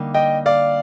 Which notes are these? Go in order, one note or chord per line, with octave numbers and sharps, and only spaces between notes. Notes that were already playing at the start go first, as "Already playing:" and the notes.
Already playing: D3 G3 A#3 D#4
D#5 G5
D5 F5